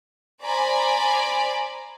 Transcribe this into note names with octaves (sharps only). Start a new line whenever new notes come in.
C5 D5 G#5 A#5 B5